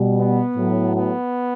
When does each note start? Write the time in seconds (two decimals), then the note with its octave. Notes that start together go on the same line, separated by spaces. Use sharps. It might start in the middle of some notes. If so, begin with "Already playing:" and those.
Already playing: B2 G3
0.21 B3
0.56 A2 F#3
0.92 B3